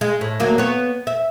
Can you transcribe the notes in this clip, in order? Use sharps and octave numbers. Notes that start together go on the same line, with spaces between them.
G#3
A2
D2 F#3 A#3
B3 C#5
E5